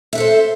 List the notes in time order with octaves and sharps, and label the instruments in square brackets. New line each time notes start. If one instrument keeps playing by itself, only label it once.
[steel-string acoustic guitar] E5
B4
A4
C5